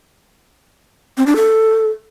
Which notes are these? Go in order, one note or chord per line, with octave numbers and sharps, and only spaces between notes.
C4
D4
A4